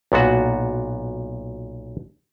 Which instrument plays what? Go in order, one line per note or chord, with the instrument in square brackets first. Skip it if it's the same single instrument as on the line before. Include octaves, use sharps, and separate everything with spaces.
[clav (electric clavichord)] B1 A#2 B3 F#4 F#5